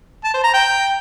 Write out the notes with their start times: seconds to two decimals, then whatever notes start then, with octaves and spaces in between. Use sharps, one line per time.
0.24 A5
0.34 C5
0.44 A#5
0.54 G5